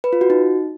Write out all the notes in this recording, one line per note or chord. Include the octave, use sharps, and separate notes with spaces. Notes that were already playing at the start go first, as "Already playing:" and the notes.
B4
F4
F#4
D#4